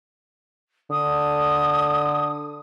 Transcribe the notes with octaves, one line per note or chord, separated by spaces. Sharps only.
D3 D#6